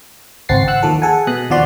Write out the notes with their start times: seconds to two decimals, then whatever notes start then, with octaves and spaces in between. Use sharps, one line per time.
0.49 G#1 C#2 C4 F#5 A6 C7
0.67 F#5 E6 F#6
0.83 D#2 D#3 F3 A4
1.02 G#4 A4 F#5 G#5
1.27 B2 D#6 F#6
1.50 D#2 B2 F3 F#4 D5 C6